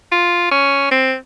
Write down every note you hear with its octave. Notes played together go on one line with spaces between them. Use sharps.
F4
C#4
C4